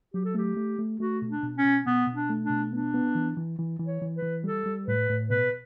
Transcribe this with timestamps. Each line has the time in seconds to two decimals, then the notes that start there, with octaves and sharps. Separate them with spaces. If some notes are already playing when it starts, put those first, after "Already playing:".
0.14 F#3 G4
0.25 A4
0.35 A3 G4
0.57 A3
0.79 A3
0.99 A3 F#4
1.22 B2
1.28 D4
1.43 B2
1.58 C#4
1.65 B2
1.86 B2 B3
2.07 B2
2.14 D4
2.29 A3
2.43 D4
2.50 B2
2.73 B3 D4
2.94 B3
3.15 E3
3.37 E3
3.59 E3
3.79 E3
3.86 C#5
4.02 E3
4.16 B4
4.23 E3
4.44 G3 A4
4.66 G3
4.87 A2 B4
5.10 A2
5.30 B2 B4